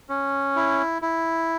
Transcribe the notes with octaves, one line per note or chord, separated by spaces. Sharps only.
C#4
E4
E4